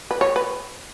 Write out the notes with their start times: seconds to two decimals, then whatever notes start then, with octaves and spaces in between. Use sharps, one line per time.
0.11 B4
0.21 C#5
0.36 B4